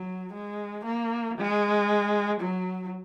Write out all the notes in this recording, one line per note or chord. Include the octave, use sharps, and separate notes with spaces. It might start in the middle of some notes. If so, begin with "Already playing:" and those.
Already playing: F#3
G#3
A#3
G#3
F#3